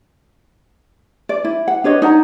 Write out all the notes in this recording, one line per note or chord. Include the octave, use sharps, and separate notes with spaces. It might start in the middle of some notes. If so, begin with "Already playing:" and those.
D5
E4
F#5
D4 B4 C#5 D#5
D#4 D5 F#5 A#5